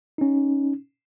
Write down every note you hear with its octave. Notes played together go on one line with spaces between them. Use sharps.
C#4 D#4